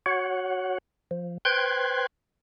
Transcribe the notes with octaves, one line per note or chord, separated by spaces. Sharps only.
F#4 C#5 F#5
F3
B4 C5 G5 C6 F#6 G#6